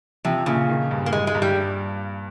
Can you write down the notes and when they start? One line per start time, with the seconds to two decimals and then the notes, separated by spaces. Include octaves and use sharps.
0.25 C3 F3
0.46 A#2 C#3
0.69 D#3
0.91 G2
1.06 A#3
1.13 G2 G#3
1.27 G#3
1.34 G2
1.42 G3